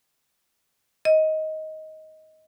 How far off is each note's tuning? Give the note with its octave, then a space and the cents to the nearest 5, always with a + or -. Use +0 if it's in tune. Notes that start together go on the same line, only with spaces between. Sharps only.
D#5 +15